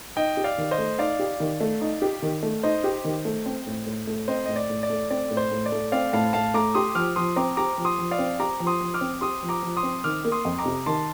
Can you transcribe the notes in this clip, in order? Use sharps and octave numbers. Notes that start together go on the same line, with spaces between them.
D#4 D#5 G5
G4
D5 F5
D#3
C5 D#5
A3
D#4 D5 F5
G4
D#3
A3
D#4
G4
D#3
A3
D#4 C5 D#5
G4
D#3
A3
C4
A2
A2
A3
C4 C5 D#5
A2 D#5
D5
A2
D5
A3
C4 D5
A2
C5
A2
D5
A3
C4 D5 F5
A2 F5 A5
A2 F5 A5
A3 A#5 D6
G4 C6 D#6
F3 D6 F6
F3 C6 D#6
C4 A#5 D6
G4 A#5 D6
F3
C6 D#6
F3
D5 F5
C4
G4 A#5 D6
F3
C6 D#6
F3
D6 F6
C4
G4 C6 D#6
F3
A#5 D6
F3
C6 D#6
C4
D#3 D6 F6
A#3
C6 D#6
F2
A#5 D6
C3
D#3 A5 C6